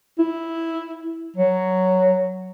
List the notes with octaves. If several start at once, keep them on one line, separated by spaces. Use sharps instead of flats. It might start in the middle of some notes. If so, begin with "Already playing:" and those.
E4
F#3